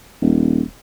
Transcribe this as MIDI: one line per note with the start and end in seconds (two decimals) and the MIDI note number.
0.21 0.61 27